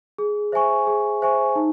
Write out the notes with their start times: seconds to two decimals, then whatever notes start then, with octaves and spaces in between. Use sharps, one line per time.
0.18 G#4
0.52 C5 E5 G#5 C#6
0.87 G#4
1.22 C5 E5 G#5 C#6
1.56 D#4